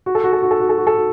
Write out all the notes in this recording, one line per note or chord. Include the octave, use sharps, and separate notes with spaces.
F#4
A4
F#4
A4
F#4
A4
F#4
A4
F#4
A4
F#4